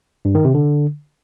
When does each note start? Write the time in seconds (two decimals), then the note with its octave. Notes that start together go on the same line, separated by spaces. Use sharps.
0.25 G2
0.35 D#3
0.45 C3
0.54 D3